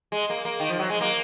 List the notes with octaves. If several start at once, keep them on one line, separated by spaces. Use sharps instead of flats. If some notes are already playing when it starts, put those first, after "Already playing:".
G#3
A#3
A#3
D#3
F3
F#3
G#3
A#3